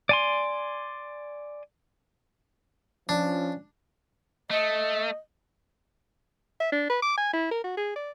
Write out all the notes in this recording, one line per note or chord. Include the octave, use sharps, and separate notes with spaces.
D5 G#5 C6
F3 C#4 D4
A3 D#5
E5
D4
B4
D6
G#5
E4
A#4
F#4
G#4
D5